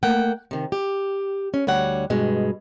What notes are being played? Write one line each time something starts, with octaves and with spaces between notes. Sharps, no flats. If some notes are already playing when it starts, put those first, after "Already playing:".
A3 A#3 F#5 G5
C3 D#3
G4
C#4
D2 G3 C#5 F#5
G2 B2 G#3